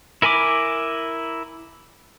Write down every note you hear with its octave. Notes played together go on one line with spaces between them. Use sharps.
E4 A#4 G#5 B5 D6